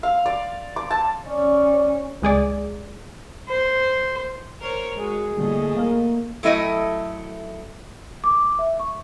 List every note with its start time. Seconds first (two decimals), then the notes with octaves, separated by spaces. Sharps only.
0.03 F5
0.26 D5
0.76 D6
0.91 A5
1.27 C#4 D5
2.22 C#2 G#3 G#4 D5
3.49 C5
4.60 A#4 C5 C#5
4.95 G#3 F#4 G#4
5.37 A2 D3 G3 A3 A#3 D#5
5.77 A#3 A#4
6.43 F#3 A3 E4 D#5 G5
8.24 D6
8.59 E5
8.79 C#6